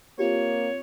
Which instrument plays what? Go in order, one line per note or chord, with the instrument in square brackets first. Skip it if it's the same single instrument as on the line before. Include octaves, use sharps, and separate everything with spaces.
[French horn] A#3 [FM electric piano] C4 F4 G4 [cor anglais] C#5